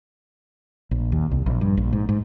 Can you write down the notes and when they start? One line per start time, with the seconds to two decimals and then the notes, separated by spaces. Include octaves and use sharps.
0.91 A#1
1.12 D#2
1.31 C2
1.46 A#1
1.61 G2
1.77 A#1
1.93 G#2
2.09 G#2